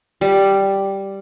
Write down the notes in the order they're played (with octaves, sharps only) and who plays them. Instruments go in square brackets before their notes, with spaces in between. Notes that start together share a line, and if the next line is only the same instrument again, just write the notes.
[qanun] G3